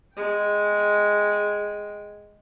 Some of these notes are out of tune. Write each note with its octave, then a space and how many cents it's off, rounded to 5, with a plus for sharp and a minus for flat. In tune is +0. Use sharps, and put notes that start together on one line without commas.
G#3 +0 G5 +0